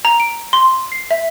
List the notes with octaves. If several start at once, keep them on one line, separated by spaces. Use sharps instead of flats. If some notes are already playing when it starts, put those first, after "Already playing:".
A#5
D7
C6
C7
E5